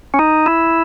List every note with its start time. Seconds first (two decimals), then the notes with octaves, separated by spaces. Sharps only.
0.14 C#4
0.19 D#4
0.46 E4